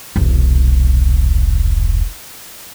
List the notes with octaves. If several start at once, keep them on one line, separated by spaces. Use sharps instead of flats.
E1 C2